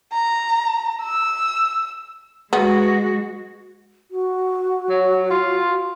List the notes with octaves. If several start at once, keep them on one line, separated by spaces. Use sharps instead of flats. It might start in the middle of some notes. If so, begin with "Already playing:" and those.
A#5
E6
G#3 B3 F#4
F#4
F#3
F4